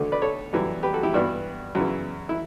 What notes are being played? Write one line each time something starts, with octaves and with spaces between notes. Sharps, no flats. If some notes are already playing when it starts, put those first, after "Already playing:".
Already playing: D2 D3 A3
B4 D5
A4 C#5
F#2 E3 G3
G4 B4
F#4 A4
E4 G4
G2 E3 B3 D4 F#4
F#2 C#3 E3
E4